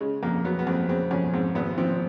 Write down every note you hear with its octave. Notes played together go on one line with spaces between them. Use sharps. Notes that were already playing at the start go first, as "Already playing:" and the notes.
C#3 G#3
F2 A#3
F#3 B3
B3
F2 C4
C#3 C4
F2 C#4
G#2 C4
G#1 B3
F3 C4